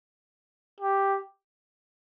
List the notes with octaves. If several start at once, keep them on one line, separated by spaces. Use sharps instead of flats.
G4